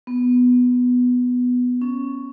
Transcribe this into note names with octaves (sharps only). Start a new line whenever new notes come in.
B3
C#4